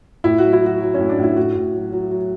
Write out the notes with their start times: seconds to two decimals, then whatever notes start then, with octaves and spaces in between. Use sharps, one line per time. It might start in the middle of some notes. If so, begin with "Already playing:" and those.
0.24 A2 E4
0.38 F#3 F#4
0.53 E4
0.62 F#3 F#4
0.81 F#3
0.94 C#4
0.99 A2
1.09 D4
1.19 A2 E4
1.37 A2 F#4
1.55 A2
1.74 F#3
1.92 F#3
2.11 F#3